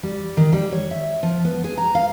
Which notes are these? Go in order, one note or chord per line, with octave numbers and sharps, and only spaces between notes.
G3
D#3
G3
C#5
E5
F3
B3
G#4
A#5
F5